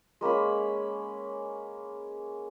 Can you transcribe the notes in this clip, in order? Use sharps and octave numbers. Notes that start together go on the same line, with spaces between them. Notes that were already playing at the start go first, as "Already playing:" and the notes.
G#3 A#3 C#4 B5